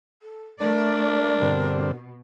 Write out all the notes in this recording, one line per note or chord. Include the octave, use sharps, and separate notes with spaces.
A4
A3 D4 A#4 D5
G2 B2 D3 C4